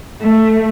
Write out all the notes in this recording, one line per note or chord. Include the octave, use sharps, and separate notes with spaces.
A3